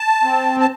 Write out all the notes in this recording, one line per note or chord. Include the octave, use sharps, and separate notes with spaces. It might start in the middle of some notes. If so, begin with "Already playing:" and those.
Already playing: A5
C4
A5